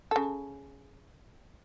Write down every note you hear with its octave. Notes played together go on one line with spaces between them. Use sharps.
C#3 A4